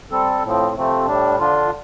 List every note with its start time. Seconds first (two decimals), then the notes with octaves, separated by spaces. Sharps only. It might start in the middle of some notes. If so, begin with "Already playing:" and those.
0.11 G3 C4 A4
0.43 A2 F3 C4
0.75 C3 F3 A3 C4
1.06 A2 G3 D4
1.38 D3 F3 D4 F4